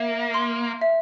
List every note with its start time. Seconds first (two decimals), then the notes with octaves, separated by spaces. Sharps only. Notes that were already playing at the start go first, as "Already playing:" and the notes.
Already playing: A#3 E5
0.34 C6
0.81 E5